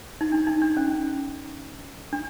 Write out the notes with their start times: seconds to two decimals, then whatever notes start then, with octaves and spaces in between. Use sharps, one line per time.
0.21 D#4
0.32 D4
0.47 D#4
0.62 D4
0.77 C#4
2.13 D4